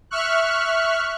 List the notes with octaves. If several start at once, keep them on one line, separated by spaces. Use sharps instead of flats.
E5 C#6 F6 F#6